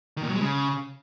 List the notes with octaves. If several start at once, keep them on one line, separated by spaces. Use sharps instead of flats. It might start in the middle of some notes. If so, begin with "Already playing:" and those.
D#3
A#2
F#3
G#3
C#3